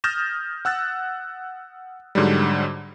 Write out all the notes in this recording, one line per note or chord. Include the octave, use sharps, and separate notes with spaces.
D#6 F6 G6 A6 A#6 E7
F#5 E6 F#6 A6
G#2 D3 F#3 G3